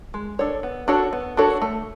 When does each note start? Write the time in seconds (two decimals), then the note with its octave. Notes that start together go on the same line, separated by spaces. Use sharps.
0.14 G#3
0.39 D4 A4 C#5
0.63 B3
0.88 D4 F#4 A4 C#5
1.13 B3
1.37 D4 F#4 A4 C#5
1.62 A3